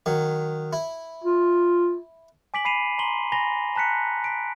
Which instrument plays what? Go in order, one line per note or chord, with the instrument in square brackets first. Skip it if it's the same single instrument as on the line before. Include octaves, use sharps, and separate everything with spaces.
[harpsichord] D#3 F#3
E4
[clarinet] F4
[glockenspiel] G#5 D6 B6 D7 F#7
B5 C7 D#7 F7
A#5 C6 F#7 G7
G#5 B5 A#6 F7 G7
A5 A#5 F#6 B6 C#7
B6 D7